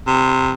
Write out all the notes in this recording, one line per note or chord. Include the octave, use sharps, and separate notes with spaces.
C3